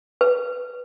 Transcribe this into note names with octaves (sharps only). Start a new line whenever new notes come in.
B4